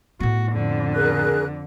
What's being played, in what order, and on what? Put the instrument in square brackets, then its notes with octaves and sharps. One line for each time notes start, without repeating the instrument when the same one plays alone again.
[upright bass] A2 B3 [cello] F#4
[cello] F2 D3
[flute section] G#4 A#4 F#6